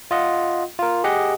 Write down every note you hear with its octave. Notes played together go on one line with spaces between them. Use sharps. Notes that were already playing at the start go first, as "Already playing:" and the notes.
F4 D#5 F#5
F4 A#4
G4 G#4 D#5 F#5